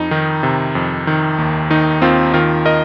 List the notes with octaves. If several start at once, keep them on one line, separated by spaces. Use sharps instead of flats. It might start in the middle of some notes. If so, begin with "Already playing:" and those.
Already playing: F2 D#4
D#3
C3
F2
D#3
D#2
D#3 D#4
D#2 C4 F4
D#3 F4 A#4
A#4 D#5